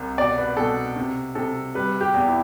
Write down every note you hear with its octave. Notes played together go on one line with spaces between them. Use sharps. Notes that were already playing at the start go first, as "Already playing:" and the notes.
Already playing: C2 C3
B2 D5
B4
B2 A4
C3
C3 A4
G3 B4
G4
E2
E4